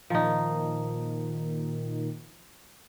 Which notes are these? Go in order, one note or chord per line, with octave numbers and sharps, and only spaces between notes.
A#2 D#3 F3 D#4